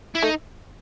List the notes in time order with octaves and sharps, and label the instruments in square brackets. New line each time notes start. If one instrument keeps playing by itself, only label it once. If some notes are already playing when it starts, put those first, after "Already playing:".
[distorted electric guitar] E4
[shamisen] A3 [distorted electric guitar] D#4